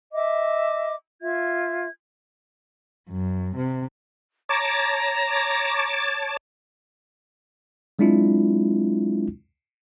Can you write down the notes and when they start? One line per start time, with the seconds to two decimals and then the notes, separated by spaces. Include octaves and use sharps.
0.12 D#5 E5 D6
1.21 F4 E5 G#6
3.09 F#2
3.56 C3
4.49 C#5 A5 A#5 D6
7.99 F#3 G#3 C4 D4 E4 F4